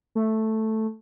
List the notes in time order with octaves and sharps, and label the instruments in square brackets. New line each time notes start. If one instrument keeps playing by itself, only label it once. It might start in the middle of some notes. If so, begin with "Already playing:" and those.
[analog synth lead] A3